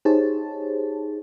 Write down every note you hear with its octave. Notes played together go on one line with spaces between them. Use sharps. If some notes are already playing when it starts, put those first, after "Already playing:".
D#4 G4 G#4 C5 C#5 A5